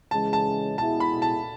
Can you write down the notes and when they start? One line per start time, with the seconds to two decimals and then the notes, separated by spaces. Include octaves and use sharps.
0.11 C#3 E3 G#3 C#4 A5
0.33 A5
0.78 B2 G#3 B3 E4 G#4 A5
1.00 B5
1.22 A5